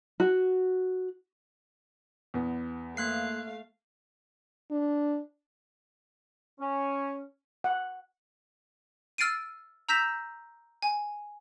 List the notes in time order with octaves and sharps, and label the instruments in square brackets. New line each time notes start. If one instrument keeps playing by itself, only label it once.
[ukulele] F#4
[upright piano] E2 B3
[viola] A3 F5 [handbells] A#3 F#6 C7
[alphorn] D4
[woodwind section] C#4
[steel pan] F#5
[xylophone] E6 F6 A6 C7 D7 D#7
A#5 E6 G6 A#6 B6 E7
G#5